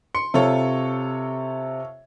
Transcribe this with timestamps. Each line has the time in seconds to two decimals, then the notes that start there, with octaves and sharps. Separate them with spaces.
0.15 C6 C#7
0.34 C3 F4 A4 C#5